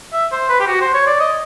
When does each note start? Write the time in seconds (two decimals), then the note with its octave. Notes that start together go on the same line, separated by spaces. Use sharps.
0.13 E5
0.32 C5
0.49 B4
0.60 G4
0.67 F#4
0.81 C5
0.94 C#5
1.07 D5
1.20 D#5